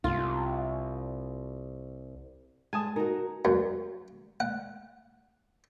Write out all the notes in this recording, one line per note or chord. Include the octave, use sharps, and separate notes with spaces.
C2 F4
G#3 G#5 A5 D#6
D#4 F#4 A#4
F#2
F#5